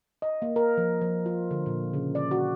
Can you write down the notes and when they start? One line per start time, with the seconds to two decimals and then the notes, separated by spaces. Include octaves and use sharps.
0.22 D#5
0.42 A#3
0.56 A#4
0.77 F3
1.01 F3
1.26 F4
1.51 D3
1.66 A#2
1.93 C#3
2.15 D5
2.31 F#4